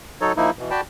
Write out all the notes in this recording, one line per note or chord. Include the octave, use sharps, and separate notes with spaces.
F#3 D#4 A4 C#5
F3 A#3 D#4 E4
B2 E3
F#4 D5 G5 A5 B5